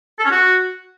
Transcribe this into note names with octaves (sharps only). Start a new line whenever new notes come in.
A4
C#4
F#4